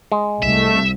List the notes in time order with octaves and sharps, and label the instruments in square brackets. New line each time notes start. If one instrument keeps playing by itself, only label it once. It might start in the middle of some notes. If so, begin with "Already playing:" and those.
[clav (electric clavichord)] G#3
[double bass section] C2 [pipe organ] A3 [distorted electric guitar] E5